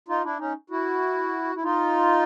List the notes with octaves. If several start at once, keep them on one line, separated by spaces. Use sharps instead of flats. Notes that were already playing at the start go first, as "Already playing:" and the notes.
D#4 F4
D4 E4
C#4 D#4
E4 F#4
E4
D#4 F4